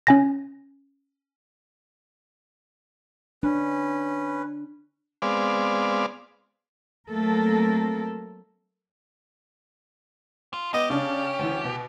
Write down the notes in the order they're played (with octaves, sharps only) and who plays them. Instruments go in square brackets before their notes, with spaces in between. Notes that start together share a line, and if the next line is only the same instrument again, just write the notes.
[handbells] C#4 G#5 A#6
[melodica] C#4 B4 [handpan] D4
[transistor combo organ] G#3 B3 C4 D5 F5
[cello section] F#3 A3 A#3 C4 A4 A#4
[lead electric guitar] F4
[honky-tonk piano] B3 [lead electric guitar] G4 [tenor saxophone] D#5
[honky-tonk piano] C#3 D4 [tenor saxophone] C#4
[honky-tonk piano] D2 E3
B2